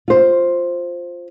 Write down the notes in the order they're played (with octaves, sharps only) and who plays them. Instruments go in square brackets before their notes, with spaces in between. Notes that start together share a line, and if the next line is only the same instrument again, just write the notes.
[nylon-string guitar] F4 C5